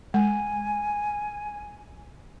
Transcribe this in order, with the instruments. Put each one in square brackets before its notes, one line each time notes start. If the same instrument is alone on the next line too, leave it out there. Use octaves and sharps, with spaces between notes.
[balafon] G#3 [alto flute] G#5